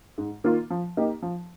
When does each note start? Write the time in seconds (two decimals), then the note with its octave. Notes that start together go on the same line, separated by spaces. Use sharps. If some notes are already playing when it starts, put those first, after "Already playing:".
0.18 G#2
0.44 D#3 A#3 F4
0.70 F3
0.97 A#3 D#4 G4
1.22 F3